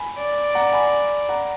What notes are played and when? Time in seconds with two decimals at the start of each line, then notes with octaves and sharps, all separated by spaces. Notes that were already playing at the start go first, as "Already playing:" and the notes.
Already playing: G#5 B5
0.18 D5
0.55 F#5 A#5
0.73 G#5 B5
1.29 F#5 A#5